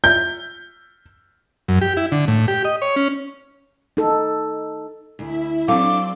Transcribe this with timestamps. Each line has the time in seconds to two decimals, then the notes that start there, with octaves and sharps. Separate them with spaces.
0.04 G6
1.68 F#2
1.81 G4
1.97 E4
2.12 D3
2.28 A2
2.48 G4
2.65 D#5
2.82 C#5
2.96 C#4
3.97 D#4 A4
5.19 D2 E4 E5
5.68 F#3 C4 D4 A4 F5 C6 D6